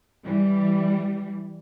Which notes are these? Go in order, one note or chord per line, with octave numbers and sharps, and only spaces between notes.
E3 G3